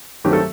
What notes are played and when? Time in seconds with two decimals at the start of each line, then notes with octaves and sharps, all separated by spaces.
0.24 G2 D#3 F#3 A3 C4 G4
0.33 A4